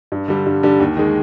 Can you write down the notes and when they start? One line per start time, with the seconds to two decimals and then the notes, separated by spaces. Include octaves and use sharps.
0.12 G2
0.28 D3 G3
0.46 G2
0.63 D3 G3
0.80 D#2
0.97 D#3 G#3